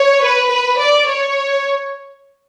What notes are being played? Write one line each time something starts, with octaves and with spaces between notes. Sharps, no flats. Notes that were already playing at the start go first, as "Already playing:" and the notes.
Already playing: C#5
B4
B4
D5
C#5